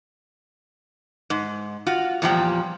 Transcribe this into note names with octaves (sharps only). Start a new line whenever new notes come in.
G#2
F4 F#4
E2 A#2 F3 G3 G5